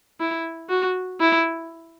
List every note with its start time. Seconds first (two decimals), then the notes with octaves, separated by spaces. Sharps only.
0.20 E4
0.70 F#4
1.20 E4